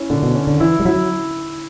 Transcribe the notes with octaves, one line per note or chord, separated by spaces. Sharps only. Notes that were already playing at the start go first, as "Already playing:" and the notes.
Already playing: C#4 E4
A#2 D3
B2
C#4
D3
E3 E4
G3
F#3 E4